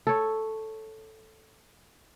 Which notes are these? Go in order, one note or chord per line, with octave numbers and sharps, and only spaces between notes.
A4 C#5